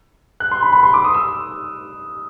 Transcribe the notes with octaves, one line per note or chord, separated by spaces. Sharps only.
F#6
C6
B5
B5
C6
D6
D#6
E6